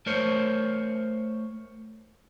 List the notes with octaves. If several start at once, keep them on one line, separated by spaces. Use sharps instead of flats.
A3 A#4 C5 C#5